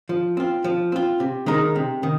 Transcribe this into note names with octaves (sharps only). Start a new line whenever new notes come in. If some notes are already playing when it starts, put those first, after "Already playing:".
F3
C4 F4
F3
C4 F4
C3
D#3 G#3 D#4 A#4
C3
D#3